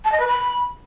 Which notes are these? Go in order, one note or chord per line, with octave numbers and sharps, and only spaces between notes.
A5
D#5
B4
B5